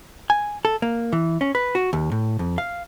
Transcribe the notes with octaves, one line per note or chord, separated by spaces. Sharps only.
G#5
A4
A#3
E3
C#4
B4
F#4
D#2
A2
F2
F5